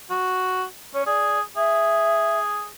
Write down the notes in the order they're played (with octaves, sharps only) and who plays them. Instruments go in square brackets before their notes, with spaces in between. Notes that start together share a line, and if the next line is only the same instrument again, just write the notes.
[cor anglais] F#4
[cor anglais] C#4 [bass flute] C#5
[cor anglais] G#4 [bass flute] D5
[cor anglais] G#4 [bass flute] E5